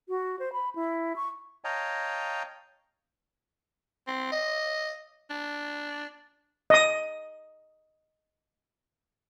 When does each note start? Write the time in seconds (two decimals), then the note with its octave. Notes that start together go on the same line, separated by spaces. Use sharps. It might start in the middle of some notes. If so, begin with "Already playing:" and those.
0.09 F#4
0.39 C5
0.53 B5
0.75 E4
1.16 C#6
1.64 C#5 D#5 F5 G5 A5 A#5
4.07 C4
4.32 D#5
5.30 D4
6.70 D#5 D#6